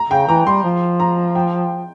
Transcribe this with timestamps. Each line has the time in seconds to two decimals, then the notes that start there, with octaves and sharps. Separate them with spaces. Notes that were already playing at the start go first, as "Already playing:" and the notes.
Already playing: A#5
0.10 C#3 G5
0.28 E3 A#5
0.46 G3 C6
0.63 F3
1.00 A#5
1.35 G5